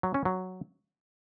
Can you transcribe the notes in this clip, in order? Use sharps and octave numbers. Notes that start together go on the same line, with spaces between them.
F#3
C#4
F#3